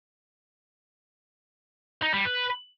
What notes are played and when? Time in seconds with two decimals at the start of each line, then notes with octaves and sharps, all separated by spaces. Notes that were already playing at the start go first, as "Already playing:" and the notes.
2.03 D#4
2.14 G3
2.25 B4